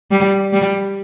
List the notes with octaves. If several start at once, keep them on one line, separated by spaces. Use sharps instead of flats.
G3
G3